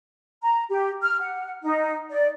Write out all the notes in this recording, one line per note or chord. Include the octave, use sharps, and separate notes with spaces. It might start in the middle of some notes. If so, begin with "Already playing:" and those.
A#5
G4
F6
F#5
D#4
D5